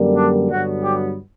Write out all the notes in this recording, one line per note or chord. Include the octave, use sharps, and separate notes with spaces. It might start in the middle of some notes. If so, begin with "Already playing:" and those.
Already playing: F#2 D3 G3 A#3
D4
G2 D3 F#3 B3 F#4
G4